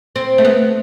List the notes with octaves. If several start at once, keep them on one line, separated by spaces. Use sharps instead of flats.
C4
A3
B3